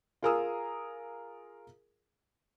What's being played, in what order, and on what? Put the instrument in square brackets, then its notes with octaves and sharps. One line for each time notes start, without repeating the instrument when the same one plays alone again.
[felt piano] F4 G#4 A#4 G#5 D#6 E6